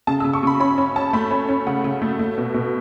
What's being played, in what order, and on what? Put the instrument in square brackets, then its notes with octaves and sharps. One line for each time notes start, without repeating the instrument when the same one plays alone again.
[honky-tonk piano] C#3 A5
E6
C#3
C#6
C#3 B5
C#4 B5
C#4
C#4 A5
A3 B5
C#4
C#4
C#3 F#5
C#3
A3
A3
B2
B2